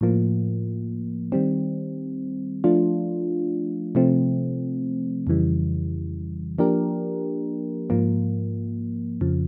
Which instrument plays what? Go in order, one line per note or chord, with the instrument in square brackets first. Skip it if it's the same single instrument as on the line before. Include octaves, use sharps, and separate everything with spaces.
[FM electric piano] A2 F3 A#3
D#3 G3 C4
F3 A3 D4 F4
C3 F3 A3 C4
F2 C#3 E3 G3
F3 A#3 D4 G4 A#4
G#2 F3 A#3
F2 C#3 F3